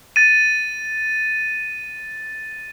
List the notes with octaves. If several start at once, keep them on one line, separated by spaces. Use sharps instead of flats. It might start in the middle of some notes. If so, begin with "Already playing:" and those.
A6 D#7